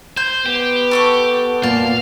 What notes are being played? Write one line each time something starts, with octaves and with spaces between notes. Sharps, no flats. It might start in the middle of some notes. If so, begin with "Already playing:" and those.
C5 G6
B3 G4
A4 C#6 D6
A#2 F5 A5